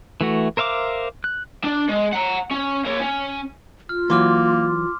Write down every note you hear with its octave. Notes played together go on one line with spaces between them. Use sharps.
E3 A3 F#4
A#4 C5 E5 F5 D6
F#6
D4
G#3
F#5 A#5
C#4
A#3 C#5
C#4
F4 F6
E3 F#3 A#3 C6 D6 F6